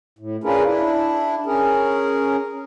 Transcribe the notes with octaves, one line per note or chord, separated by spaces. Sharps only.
A2
C#4 D4 F4 G#4 A#4 B4
D4 E4
C#4 G#4 A#4